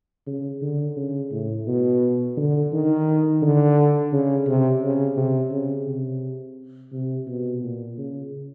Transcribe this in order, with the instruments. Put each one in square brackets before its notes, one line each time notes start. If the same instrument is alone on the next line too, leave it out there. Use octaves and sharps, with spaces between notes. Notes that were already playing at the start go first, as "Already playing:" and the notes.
[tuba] C#3
D3
C#3
A2
B2
D3
D#3
D3
C#3
C3
C#3
C3
C#3
C3
C3
B2
A#2
C#3